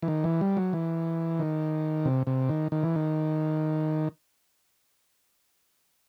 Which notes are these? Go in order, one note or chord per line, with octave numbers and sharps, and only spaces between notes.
E3
D#3
E3
G3
F#3
E3
D#3
C3
C3
D#3
D#3
E3
D#3